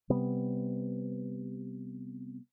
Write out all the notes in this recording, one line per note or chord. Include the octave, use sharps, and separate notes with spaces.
C3 G3 B3